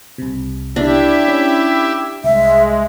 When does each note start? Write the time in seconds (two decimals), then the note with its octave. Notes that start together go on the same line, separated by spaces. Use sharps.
0.18 C2 C3
0.76 D4 E4 G4 E5
1.28 C#4
2.24 C2 G#3 E5